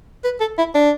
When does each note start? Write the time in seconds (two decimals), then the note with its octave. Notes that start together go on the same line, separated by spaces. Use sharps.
0.24 B4
0.40 A4
0.58 E4
0.75 D4